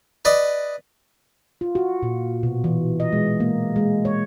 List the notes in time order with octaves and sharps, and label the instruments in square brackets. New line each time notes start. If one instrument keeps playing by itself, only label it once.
[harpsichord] B4 D5 D#5
[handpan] F4
F#4
A#2
B2
E3
D#5
G#3
A#3
G#3
C#5